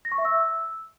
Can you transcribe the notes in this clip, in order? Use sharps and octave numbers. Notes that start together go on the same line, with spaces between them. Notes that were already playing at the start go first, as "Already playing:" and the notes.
A#6
C#6
E5
E6